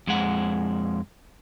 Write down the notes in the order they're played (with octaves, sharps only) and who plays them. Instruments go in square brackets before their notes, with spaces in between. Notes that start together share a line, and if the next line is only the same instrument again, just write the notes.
[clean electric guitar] F2 G#3 F#5